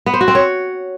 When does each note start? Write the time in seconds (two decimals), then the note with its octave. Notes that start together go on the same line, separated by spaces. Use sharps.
0.06 B3
0.14 C5
0.21 F#4
0.28 C4
0.35 C#5